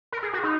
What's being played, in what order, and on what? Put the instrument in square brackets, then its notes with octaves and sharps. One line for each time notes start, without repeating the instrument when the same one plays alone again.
[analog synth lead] A#4
G#4
F#4
D#4